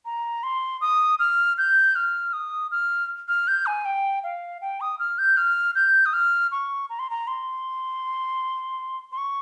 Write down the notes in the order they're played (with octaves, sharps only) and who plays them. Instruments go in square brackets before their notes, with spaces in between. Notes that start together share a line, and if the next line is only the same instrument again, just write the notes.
[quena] A#5
C6
D#6
F6
G6
F6
D#6
F6
F6
G6
G#5
G5
F5
G5
D#6
F6
G6
F6
G6
D#6
F6
C#6
A#5
C6
A#5
C6
C6
C#6